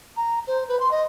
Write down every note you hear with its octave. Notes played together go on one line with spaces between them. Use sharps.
A#5
C5
B4
C6
D#5